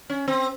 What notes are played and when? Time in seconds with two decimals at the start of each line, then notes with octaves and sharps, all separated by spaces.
0.10 C#4
0.28 C4